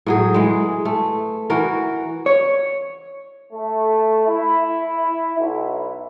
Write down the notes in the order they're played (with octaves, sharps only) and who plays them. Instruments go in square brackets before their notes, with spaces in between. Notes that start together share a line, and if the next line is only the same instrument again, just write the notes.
[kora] A2 F#3 G#4
E3 G#3
A3
E3 F#4 A#4
[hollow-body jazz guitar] C#5
[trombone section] A3
E4
B1